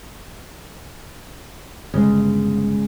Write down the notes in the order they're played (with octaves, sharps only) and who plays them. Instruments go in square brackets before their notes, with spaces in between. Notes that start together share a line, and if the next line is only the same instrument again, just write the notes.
[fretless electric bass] G1 [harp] C#3 G#3